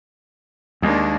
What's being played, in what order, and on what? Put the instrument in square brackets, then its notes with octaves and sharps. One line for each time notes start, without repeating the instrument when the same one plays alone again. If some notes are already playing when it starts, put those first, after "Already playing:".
[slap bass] D#2 [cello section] G#3 A#3 D4